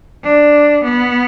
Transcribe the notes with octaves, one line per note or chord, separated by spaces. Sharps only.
D4
B3